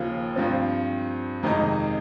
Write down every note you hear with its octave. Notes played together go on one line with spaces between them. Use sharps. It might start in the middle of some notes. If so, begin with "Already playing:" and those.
Already playing: D#2 C#3 F3 A#3
G2 F3 C4
F2 C3 D#3 G#3 D#4